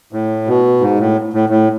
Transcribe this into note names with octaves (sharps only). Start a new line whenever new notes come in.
A2
B2
G#2
A2
A2
A2